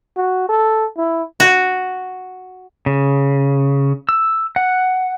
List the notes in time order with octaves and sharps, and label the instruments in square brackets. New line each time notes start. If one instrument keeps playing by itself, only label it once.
[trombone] F#4
A4
E4
[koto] F#4
[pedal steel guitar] C#3
E6
F#5